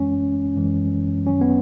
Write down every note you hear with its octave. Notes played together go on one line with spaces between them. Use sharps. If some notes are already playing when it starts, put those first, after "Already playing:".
Already playing: F#2 E3 G#3 C#4
F#2 E3 G#3
F#2 D#3 F#3 C#4
B3